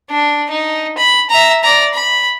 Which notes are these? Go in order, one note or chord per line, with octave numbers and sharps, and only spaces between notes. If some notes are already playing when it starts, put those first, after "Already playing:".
D4
D#4
B5
E5 A#5
D5 A#5
B5